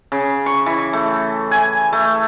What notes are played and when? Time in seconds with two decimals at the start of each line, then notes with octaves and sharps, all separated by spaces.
0.12 C#3
0.46 C#6
0.66 E3
0.93 A3
1.51 G#5
1.92 A3